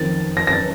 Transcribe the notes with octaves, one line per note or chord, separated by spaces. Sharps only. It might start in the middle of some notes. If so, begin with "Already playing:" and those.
Already playing: F2 D#3 A6
A#6
A#6
A6